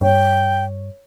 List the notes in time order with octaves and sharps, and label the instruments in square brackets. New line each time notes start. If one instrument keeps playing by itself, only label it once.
[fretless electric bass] G2 [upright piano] C#5 [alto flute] G5